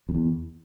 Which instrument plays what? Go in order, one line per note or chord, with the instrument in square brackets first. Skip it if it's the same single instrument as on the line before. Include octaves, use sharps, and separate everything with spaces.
[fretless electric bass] F2
E2